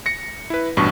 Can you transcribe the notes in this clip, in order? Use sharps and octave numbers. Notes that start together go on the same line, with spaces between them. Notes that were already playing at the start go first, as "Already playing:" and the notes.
A#6 C#7
E4 B4
A1 G2 B2 C#6